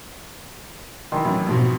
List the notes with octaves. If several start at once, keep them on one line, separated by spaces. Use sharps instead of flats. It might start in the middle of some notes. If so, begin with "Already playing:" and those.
D#3 E3 C6
F#2 A2
F2 G#2 B2